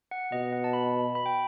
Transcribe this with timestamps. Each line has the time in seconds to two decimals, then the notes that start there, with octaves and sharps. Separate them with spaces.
0.11 F#5
0.32 B2 D#5
0.53 F#5
0.64 A5
0.73 B5
1.15 B5
1.26 G5